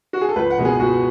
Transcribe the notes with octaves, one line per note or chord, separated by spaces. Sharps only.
F#4
G#4
A4
C#2 B4
F#5
B2 G#3 B3
G#4
C#2 F#4